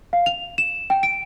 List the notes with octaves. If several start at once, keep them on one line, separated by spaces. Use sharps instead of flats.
F5
F7
E7
G5
D7